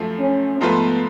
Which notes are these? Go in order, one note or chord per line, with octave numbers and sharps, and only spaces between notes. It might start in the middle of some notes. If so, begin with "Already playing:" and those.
Already playing: F#2 F3 A3
C#4
G#2 F3 A3 B3 F4 B4